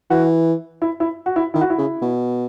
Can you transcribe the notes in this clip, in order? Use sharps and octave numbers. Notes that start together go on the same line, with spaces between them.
E3 F#4
E4
E4
F#4
E4
D#3 E4
F#4
E4
C#3
B2